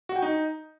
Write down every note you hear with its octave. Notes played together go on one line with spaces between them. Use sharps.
F#4
G5
D#4